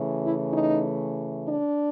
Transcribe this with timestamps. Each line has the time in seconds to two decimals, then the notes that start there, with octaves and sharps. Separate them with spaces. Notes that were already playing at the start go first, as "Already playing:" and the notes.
Already playing: C#3 E3 A3
0.23 E4
0.53 D#4
1.47 D4